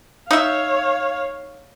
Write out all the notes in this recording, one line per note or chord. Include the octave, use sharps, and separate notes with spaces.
D#4 C#5 E5 F5